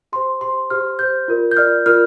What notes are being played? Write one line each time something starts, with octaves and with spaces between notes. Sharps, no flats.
G4 C5 C6
G4 C5 C6
G4 C5 F6
G4 C5 G6
F4 A#4 D5
G6
F4 A#4 D5 F6
F4 A#4 D5 F6